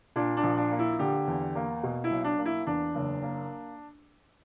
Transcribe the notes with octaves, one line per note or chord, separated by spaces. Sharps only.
A#2 D4
D4
A#1
D4
A#3
E4
D3 G4
E2
A#3
B2
E4
B1
D4
A#3
E4
E2 D4
F#1
A#3